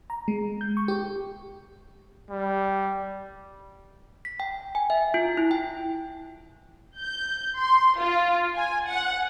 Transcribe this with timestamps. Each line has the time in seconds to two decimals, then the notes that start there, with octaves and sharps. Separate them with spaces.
0.10 A#5
0.28 G#3
0.61 G6
0.77 C#6
0.88 G4
2.30 G3
4.25 B6
4.40 G5
4.75 G#5
4.90 E5
5.14 F4
5.37 E4
5.51 G5
6.97 G6
7.58 C6
7.98 F4
8.55 G#5
8.87 F#5